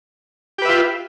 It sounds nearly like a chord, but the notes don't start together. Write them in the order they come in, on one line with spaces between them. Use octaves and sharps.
G4 B4 E5 F4